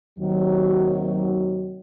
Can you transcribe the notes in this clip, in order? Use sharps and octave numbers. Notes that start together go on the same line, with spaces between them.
D#2 C3 D#3 F#3